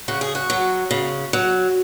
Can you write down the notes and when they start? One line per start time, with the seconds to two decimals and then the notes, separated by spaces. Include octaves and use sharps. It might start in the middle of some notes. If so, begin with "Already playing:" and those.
0.08 C#3 F#4
0.21 G#4
0.35 F#4
0.50 F#3
0.91 C#3
1.33 F#3